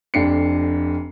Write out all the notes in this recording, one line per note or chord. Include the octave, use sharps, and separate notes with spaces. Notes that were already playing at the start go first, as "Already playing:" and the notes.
F1 F2 D4 C7 C#7